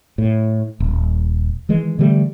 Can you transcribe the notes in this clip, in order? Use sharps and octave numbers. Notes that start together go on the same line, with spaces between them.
A2
D#1
D#3 E3 G#3
D3 E3 G3 A3